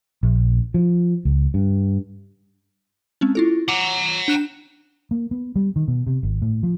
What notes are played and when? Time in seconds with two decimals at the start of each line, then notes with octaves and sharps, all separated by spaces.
0.23 A#1
0.74 F3
1.25 C#2
1.54 G2
3.21 G#3 C4 C#4
3.35 E4 F4 A4
3.68 F#5 A#5 D6
4.28 D4 F#6 E7
5.11 A#3
5.31 B3
5.56 G3
5.76 D#3
5.88 B2
6.07 C3
6.23 G#1
6.42 A2
6.63 F3